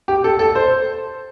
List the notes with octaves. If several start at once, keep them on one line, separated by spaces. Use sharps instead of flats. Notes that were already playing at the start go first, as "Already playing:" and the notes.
G4
A4
A4
C5